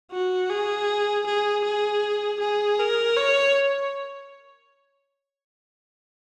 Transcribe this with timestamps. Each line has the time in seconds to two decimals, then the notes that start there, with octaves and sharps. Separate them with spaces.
0.12 F#4
0.50 G#4
1.26 G#4
1.64 G#4
2.40 G#4
2.79 A#4
3.16 C#5